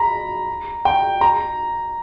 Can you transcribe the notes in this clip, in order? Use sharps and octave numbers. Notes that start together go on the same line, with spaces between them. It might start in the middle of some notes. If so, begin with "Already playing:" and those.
Already playing: A#5 B5
G5
A#5